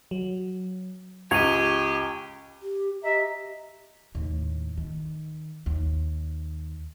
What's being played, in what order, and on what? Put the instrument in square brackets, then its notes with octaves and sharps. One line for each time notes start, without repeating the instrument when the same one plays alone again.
[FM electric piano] F#3
[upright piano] C#2 F7 [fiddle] G4 [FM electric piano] C#6 [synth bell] G#6 D#7
[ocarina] G4
[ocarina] G4 [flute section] D#5 E5 A#5
[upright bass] D#2 A2
D#3
D#2